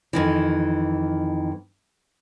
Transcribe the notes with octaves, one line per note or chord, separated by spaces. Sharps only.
F2 D#3 E3